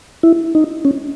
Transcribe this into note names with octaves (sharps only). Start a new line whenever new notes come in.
E4
D#4
C#4